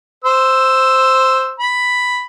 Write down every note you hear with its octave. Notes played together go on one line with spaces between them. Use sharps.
C5 E6
B5